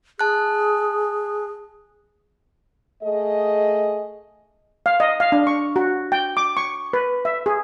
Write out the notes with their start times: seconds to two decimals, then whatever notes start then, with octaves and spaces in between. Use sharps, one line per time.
0.19 G#4 A5 F#6
3.03 A3 G#4 D#5
4.86 F5
5.00 D#5
5.20 F5
5.32 D4
5.47 C#6
5.76 F#4
6.12 G5
6.37 D6
6.57 C#6
6.93 B4
7.25 E5
7.46 G#4